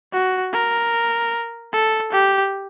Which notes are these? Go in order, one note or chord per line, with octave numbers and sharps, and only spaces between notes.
F#4
A#4
A4
G4